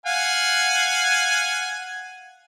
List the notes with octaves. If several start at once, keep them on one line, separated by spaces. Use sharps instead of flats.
F5 F#5 G#5